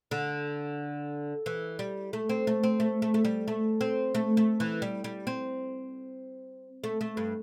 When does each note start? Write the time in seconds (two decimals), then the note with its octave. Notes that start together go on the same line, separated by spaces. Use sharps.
0.11 D3
1.46 E3
1.79 G3
2.13 A3
2.29 C4
2.47 A3
2.63 C4
2.80 A3
3.02 A3
3.14 A3
3.25 G3
3.48 A3
3.81 C4
4.15 A3
4.37 A3
4.60 E3
4.82 G3
5.04 G3
5.27 C4
6.84 A3
7.01 A3
7.17 G2